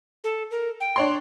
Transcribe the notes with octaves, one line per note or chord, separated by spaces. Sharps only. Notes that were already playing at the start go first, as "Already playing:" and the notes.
A4
A#4
G5
D4 C#5 C6